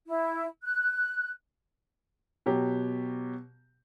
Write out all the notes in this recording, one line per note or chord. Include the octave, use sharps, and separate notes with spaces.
E4
F#6
B2 F#3 G4